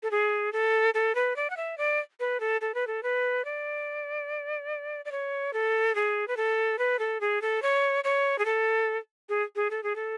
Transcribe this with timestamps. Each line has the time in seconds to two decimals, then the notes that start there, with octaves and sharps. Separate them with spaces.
0.03 A4
0.11 G#4
0.53 A4
0.94 A4
1.15 B4
1.36 D5
1.50 F#5
1.57 E5
1.78 D5
2.20 B4
2.40 A4
2.61 A4
2.74 B4
2.87 A4
3.03 B4
3.45 D5
5.05 D5
5.12 C#5
5.53 A4
5.95 G#4
6.28 B4
6.37 A4
6.79 B4
6.99 A4
7.21 G#4
7.42 A4
7.62 C#5
8.04 C#5
8.39 G#4
8.45 A4
9.29 G#4
9.56 G#4
9.71 A4
9.83 G#4
9.96 A4